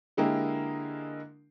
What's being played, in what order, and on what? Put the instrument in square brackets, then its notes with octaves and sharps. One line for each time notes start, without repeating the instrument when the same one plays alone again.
[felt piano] D3 G#3 A#3 E4 G4 A#4